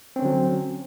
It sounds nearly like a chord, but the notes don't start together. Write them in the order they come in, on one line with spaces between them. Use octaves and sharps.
C4 C#4 D3 F#3